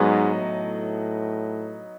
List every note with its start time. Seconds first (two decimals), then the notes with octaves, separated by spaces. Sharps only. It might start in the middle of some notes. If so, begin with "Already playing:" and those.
Already playing: G#2 F#3 B3 D#4
0.34 A2